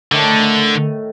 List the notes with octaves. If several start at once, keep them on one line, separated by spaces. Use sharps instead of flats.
A2 D3 D#3 A3